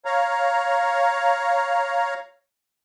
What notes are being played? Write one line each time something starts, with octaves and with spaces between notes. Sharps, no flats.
C#5 F5 A#5